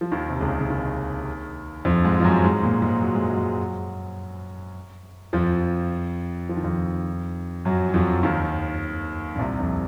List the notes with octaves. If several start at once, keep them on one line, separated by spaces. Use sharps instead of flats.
F3
D#2 D#3
C3
C#2 C#3
C#3
D#2 D#3
F2 F3
G#2 G#3
F3
F#2 F#3
G#2 G#3
A#2 A#3
G#2 G#3
F#3
G#3
F#2 F#3
F2 F3
F3
D#3
F2 F3
F#2 F#3
F#3
F2 F3
D#2 D#3
A#2
C2 C3
F2